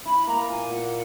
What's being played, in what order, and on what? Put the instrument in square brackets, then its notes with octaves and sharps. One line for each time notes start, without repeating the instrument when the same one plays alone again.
[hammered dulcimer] E4 [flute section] B5
[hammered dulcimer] A#3 [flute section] A#5
[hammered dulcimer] A#2 [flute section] G#5
[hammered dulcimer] A#2 [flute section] F#5